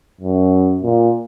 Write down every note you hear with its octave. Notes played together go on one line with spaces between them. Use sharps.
F#2
A#2